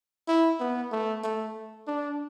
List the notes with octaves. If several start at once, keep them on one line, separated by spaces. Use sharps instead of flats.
E4
B3
A3
A3
D4